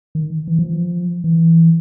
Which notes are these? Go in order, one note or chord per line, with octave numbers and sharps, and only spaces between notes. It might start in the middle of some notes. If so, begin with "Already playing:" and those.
D#3
E3
F3
E3